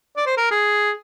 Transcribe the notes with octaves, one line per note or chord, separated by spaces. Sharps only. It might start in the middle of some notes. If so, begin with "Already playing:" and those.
D5
C5
A#4
G#4